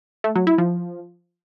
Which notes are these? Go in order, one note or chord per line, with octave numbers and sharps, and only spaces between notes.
A3
F#3
E4
F3